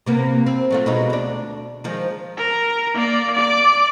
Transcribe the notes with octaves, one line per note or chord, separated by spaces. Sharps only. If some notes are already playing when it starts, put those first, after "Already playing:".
C3 A#3 B3
C4
F#3 A3 F4
B2 G#3 D#4
D2 D4
D#3 F3 G#3
A#4
A#3 D5
D5 D6